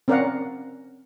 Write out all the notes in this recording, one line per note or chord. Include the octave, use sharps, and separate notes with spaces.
C4 C#4 A#4 D5 F5 F#5